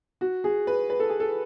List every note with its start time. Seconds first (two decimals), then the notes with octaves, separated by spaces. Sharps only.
0.21 F#4
0.44 G#4
0.67 B4
0.90 B4
1.00 A4
1.09 G#4
1.20 A4